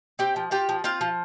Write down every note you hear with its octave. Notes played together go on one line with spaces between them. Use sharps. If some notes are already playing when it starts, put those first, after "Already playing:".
C4 G4 G5
F3
F4 G4 G5
F3
C4 F4 F5
F3